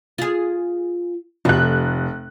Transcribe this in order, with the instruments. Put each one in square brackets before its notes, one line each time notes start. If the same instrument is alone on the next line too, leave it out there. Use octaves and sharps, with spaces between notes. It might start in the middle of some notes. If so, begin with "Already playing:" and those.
[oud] F4 G#4
[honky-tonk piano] F1 F#6 [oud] A3